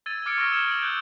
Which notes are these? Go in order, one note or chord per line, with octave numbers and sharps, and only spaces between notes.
E6 G#6 A6 D#7
D6 F6 G#6 C#7 D7
C#6 E6 F6 G#6 A#6 G7
D#6 F6 G#6 E7
D7 F#7
E6 F#6 G6